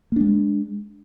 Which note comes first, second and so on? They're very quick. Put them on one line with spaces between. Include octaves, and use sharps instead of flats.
A#3 D4 G#3